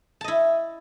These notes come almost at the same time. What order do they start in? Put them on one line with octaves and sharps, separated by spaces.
A5 D#5 E4